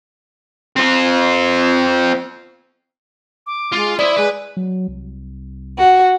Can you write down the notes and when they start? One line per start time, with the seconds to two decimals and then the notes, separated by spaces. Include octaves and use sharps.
0.76 C4 F4
3.47 D6
3.72 G#3 F4
3.99 E4 C5 D5 E5 D#6
4.16 G#3 B4
4.57 F#3
4.88 C2
5.78 F#4